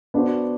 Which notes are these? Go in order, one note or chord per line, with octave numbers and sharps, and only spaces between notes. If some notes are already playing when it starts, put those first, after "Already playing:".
B3 D4 F#4 C5